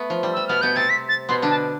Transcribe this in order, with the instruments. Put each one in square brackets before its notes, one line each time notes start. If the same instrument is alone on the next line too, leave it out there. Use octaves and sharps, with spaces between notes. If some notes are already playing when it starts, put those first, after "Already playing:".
Already playing: [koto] A3 B3
F3
G3
[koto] G3 [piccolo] E6
[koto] B2 B3 [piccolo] F6
[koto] B2 B3 [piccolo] G6
[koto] C3 C4 [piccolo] A6
[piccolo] B6
A6
[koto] B2 B3 [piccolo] C6
[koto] D3 D4
[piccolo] A5